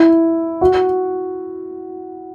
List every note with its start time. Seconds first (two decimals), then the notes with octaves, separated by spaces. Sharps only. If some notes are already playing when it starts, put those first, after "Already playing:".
Already playing: E4
0.61 F#4